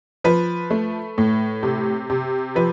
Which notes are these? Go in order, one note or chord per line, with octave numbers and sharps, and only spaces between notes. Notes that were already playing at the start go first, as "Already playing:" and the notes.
F3 B4
A3
A2
C3
C3
F3 B4